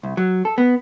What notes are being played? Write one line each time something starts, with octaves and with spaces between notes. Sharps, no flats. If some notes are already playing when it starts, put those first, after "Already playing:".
C2
F#3
A4
B3